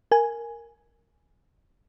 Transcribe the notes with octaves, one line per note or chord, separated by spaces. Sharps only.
A#4 G#5